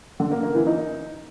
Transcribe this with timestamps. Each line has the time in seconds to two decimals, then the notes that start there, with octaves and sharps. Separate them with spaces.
0.20 D3
0.31 A#3
0.43 A#3
0.55 E3
0.67 D#4